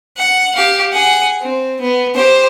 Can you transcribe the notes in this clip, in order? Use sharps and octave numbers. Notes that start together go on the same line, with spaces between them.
F#5
G4 F5
G#4 F#5
C4
B3
G4 C5